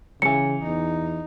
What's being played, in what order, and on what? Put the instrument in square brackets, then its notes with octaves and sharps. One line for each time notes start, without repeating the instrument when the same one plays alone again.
[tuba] C#3 [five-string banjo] E3 F#3 [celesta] C#7
[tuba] E2 [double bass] D#4